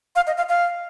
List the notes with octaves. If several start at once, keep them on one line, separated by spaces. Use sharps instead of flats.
F5
D#5
F5
F5